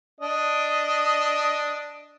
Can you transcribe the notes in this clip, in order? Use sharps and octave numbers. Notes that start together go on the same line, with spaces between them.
D4 D#5